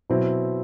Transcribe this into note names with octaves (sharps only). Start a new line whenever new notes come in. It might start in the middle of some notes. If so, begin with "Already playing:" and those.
B2 F#3 C4 E4